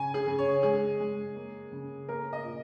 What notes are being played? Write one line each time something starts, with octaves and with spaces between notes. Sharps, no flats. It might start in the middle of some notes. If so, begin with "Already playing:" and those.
Already playing: C#3 G#5
G#4
C#3
C#5
G#3 G#4
G#3
A#3
C#3
A#3 A#4
D#5
A#2